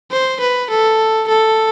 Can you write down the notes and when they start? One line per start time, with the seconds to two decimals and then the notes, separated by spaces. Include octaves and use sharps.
0.11 C5
0.40 B4
0.70 A4
1.28 A4